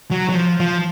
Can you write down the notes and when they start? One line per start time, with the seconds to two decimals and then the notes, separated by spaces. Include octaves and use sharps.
0.11 F#3
0.29 F#3
0.35 F3
0.60 F3